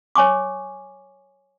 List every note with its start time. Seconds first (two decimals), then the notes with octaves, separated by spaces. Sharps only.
0.15 C#5 G#5 C#6 D6